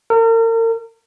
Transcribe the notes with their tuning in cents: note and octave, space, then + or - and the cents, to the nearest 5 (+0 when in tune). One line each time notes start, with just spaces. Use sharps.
A#4 -40